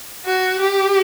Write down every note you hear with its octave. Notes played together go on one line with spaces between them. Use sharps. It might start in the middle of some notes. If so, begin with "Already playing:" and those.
F#4
G4